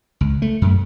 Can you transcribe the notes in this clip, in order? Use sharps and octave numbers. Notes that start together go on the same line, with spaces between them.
C#2
A3
F#2